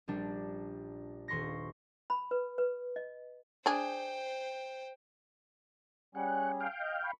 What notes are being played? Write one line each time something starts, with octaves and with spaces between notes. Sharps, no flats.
A#1 G3 D4
D#1 C6 C#6 A#6
B5
B4
B4
D#5
D4 G#4 C5 G5
G3 C#4 G#4 F#5
F5 G5
D#5
B5 C#6